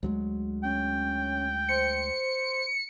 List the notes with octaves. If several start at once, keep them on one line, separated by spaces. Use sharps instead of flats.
D2 F#3 G#3
C#4 G5
C5 C#7